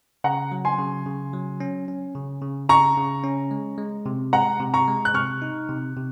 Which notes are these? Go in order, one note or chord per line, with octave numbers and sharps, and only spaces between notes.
C#3 F#5 A#5
F#3
G#5 C6
C#3
C#3
F#3
C#4
C#4
C#3
C#3
C#3 A#5 C#6
C#3
C#4
G#3
G#3
C3
G#3 F#5 A#5
C3
A#5 C#6
G#3
F#6
C3 C#6 F6
D#4
C3
C3